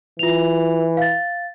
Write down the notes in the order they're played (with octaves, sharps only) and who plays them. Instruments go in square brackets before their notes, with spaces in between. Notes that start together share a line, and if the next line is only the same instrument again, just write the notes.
[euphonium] E3 [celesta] F4 F7
[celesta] F5 A6